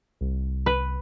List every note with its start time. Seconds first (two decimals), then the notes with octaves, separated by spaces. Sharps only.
0.21 C2
0.66 B4